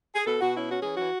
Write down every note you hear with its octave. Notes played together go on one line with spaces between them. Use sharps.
G#4
B2 A4
B2 F#4
C#4 E4
C#4 F#4
E3 G#4
E3 F#4